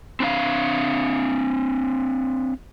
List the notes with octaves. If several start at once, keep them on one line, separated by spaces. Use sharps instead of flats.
C4 D4 F5